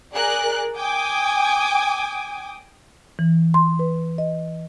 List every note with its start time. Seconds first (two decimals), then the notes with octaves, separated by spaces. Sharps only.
0.13 G#4 A#4 D5 F#6
0.78 G5 G#5 D6 D#6
3.19 E3
3.54 C6
3.79 B4
4.18 D#5